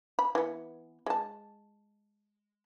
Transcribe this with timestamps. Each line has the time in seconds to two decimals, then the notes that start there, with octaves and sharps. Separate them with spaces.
0.19 B5
0.35 E3 B3
1.06 G#3 A5